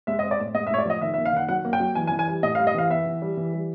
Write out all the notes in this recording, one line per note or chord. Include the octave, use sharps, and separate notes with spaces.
G#3 E5
D#5
C4
D5
A2
G#3 D#5
E5
A2 C#5
D5
F3 D#5
D#3 E5
E5
A#3
F5
D#3 F#5
F#3 F#5
A#3
G5
F#3
E3 G#5
G#5
E3
G#5
G3
A2 D#5
F5
G3
D#5
E3 F5
B3 E5
E3
G3
E3
G3